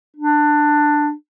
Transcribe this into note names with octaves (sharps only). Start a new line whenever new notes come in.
D4